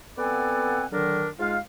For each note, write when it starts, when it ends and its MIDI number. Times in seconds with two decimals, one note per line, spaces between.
0.18 0.85 59
0.18 0.85 60
0.18 0.85 69
0.18 0.85 74
0.18 0.85 78
0.18 0.85 80
0.92 1.27 50
0.92 1.27 51
0.92 1.27 54
0.92 1.27 62
0.92 1.27 70
1.40 1.58 44
1.40 1.58 56
1.40 1.58 65
1.40 1.58 77